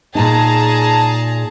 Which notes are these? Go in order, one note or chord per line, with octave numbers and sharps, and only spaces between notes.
A#2 D#4 G#4 A5 A#5